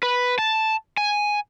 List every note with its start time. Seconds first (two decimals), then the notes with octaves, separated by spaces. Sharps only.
0.03 B4
0.39 A5
0.97 G#5